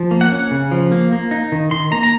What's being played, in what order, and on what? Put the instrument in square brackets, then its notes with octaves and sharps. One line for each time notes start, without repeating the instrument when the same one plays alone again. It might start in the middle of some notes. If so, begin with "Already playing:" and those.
Already playing: [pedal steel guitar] F3
A#3
F#5
C#4
C#3
F3
A#3
A#3
D#4
D#3
D#3 C6
A#3 A#5
A#5